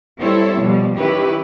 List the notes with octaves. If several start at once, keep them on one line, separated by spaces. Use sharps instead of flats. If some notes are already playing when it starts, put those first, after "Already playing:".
G3 C4 E4 A4 C#5
B2 F3 G3
D#3 F#3 C#4 E4 G4 B4